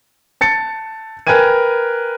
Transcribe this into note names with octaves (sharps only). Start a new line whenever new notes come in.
A5 A6 C#7
A#4 B4 G5 G#5 G#6 D#7